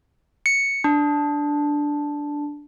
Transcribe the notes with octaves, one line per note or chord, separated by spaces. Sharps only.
C#7
D4